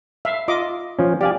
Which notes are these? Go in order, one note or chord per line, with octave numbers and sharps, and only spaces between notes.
E5 F5
F4 D#5 D6
F3 C#4
G4 D5 F5 G#5